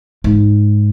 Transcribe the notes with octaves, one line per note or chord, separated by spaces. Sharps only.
G#2